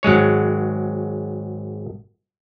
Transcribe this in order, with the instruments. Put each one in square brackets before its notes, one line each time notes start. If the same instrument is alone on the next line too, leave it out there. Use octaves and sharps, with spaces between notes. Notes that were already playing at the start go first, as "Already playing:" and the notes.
[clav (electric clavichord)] G#1 F#3 G#3 C#5